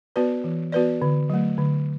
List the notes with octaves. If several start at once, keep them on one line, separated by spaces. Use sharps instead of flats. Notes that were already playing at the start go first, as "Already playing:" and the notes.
B3 F#4 B4 D5
E3
B3 F#4 B4 D5
D3
F#3 A3
D3